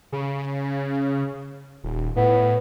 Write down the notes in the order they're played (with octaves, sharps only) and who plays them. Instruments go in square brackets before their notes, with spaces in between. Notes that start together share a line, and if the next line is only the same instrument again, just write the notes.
[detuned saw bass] C#3
D#1
[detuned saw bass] A2 [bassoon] B3